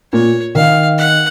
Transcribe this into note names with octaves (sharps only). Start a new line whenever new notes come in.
A#2 A#3 C#5
D#3 D#4 F5
F#5